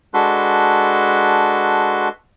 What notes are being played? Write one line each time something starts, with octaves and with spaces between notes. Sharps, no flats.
G#3 D4 F#4 A4 B4 C6